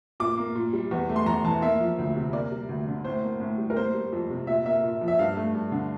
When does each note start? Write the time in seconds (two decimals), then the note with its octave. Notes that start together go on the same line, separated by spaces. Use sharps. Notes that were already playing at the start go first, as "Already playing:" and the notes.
0.20 A#2 D6
0.37 A#3
0.55 A#2
0.73 G3
0.91 E2
1.09 A3
1.16 C6
1.26 E2 A#5
1.44 E3 A5
1.62 A#3 E5
1.80 F3
1.98 D2
2.16 C3
2.33 A#3 D5
2.51 G3
2.69 D2
2.88 D3
3.05 A2 C5
3.23 A#3
3.40 A2
3.58 G3
3.70 A#4
3.77 A#3 C5
3.94 G3
4.12 F2
4.30 C3
4.47 A#2 E5
4.66 A#3 E5
4.83 A#2
5.01 F3
5.08 E5
5.19 G2 F5
5.37 A3
5.54 G2
5.72 D3